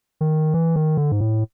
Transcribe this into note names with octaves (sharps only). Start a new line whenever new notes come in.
D#3
E3
D#3
D3
G#2
A2